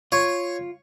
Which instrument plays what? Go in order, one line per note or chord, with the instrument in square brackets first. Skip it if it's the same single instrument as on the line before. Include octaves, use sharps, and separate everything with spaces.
[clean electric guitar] F4 [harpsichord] C#5